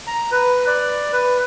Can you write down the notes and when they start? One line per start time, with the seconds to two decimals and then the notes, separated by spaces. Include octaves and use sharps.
0.07 A#5
0.31 B4
0.67 D5
1.12 B4